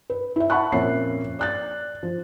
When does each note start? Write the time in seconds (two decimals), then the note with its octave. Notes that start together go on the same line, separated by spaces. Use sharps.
0.10 B4
0.36 E4 E5
0.50 E5 F#5 A5 B5 C#6 F#6
0.72 F2 A#2 A#3 C#4 E5 C7
1.39 D5 F#6 A6
2.03 F3